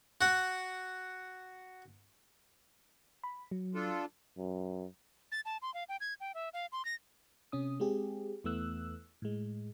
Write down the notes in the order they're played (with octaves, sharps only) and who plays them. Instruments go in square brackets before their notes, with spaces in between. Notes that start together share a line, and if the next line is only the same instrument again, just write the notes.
[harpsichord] F#4 F#5
[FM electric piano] B5
F#3
[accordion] D4 F4 A4
[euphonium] F#2
[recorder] A6
A5
C6
F5
G5
G#6
G5
E5
F5
C6
A#6
[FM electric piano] C3 C#4 D#6
G#3 C4 G4 G#4
E2 E3 A3 B3 E6 F#6
A2 G#3